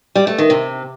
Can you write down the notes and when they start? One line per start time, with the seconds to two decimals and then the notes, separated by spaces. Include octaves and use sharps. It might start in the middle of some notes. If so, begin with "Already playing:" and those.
0.16 G3
0.27 A3
0.38 D#3
0.50 C3